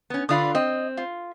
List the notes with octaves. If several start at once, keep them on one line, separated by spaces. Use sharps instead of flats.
B3 C#4
D3 F4 B4 D5 D#6
C4 D#5
F4